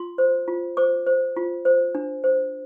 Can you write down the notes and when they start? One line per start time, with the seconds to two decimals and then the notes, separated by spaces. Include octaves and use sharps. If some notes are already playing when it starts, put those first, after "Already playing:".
Already playing: F4 C6
0.18 C5
0.48 F4
0.77 C5 D6
1.07 C5
1.37 F4
1.65 C5
1.95 D4
2.24 C5